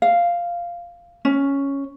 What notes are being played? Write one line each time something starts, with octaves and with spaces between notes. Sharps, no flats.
F5
C#4